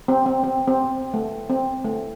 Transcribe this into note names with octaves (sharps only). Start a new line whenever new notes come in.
C4
C4
C4
C4
A3
C4
A3